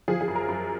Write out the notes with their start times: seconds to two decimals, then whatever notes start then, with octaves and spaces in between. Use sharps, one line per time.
0.08 F3 G#4
0.21 G#4
0.28 F#2
0.35 A#4
0.48 F#2